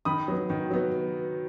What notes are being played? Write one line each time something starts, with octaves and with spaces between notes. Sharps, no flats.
D#3 B5 D#6
F#3 B3
D#3
F#3 B3